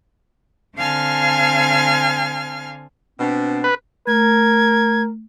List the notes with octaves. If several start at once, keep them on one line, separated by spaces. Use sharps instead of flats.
D3 C4 F5 G#5 A5 F6
B2 C4 D4
B4
A3 A#4 G#6